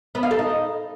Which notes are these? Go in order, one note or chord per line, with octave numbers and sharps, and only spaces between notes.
B3
F5
A4
D#4